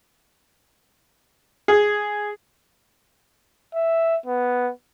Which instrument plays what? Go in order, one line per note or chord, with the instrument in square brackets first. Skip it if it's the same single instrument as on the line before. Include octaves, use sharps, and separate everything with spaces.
[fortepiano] G#4
[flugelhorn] E5
B3